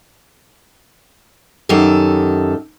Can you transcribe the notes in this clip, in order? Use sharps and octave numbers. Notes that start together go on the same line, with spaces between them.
F#2 D#3 G4 A4